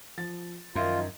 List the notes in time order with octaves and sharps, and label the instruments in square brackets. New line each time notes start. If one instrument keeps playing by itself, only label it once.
[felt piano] F3 A6
[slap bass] F#2 [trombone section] D#3 F3 D#4 [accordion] F4 [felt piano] E5 C6